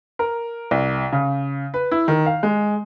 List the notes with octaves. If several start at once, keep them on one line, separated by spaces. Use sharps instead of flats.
A#4
C2
C#3
B4
E4
D#3
F5
G#3